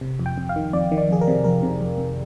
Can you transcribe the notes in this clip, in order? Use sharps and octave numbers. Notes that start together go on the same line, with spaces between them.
C3
F2
G5
F2
F5
D#3
F2 D5
D#3
D5
F2 G#4
A#4
C3
F2 A#4
C3
F2
F2